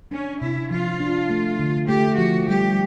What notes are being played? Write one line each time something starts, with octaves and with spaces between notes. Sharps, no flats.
C#4 D4
C3 E4
F3 F4
D4
A3
D3
A3 G4
F3 F#4
G3 G4